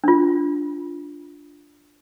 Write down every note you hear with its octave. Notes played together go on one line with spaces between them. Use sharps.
D4 F4